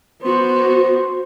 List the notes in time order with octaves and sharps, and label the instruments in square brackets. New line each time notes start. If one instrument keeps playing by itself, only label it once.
[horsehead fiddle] B3 F#4 [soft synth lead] C5